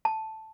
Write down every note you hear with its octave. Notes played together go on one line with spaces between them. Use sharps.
A5